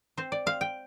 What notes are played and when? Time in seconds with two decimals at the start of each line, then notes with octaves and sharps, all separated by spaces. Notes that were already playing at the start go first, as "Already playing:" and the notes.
0.17 C4 C5
0.32 D5
0.46 C4 F5
0.61 G5